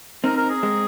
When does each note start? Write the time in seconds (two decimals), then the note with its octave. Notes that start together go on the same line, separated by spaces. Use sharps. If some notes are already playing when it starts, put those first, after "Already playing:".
0.24 C4 D#4 A#4
0.37 A#4
0.50 G#4
0.63 G#3 C4